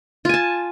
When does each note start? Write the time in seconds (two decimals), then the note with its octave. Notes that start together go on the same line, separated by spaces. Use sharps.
0.25 F4
0.29 G#5
0.34 A5